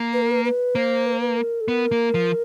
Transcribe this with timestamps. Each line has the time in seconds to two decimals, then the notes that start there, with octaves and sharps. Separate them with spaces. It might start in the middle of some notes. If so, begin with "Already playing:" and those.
Already playing: A#3
0.13 B4
0.22 A#4
0.31 B4
0.45 B4
0.75 A#3 C5
1.07 B4
1.13 C5
1.20 B4
1.37 A#4
1.61 A4
1.68 B3 A#4
1.92 A#3
2.14 F3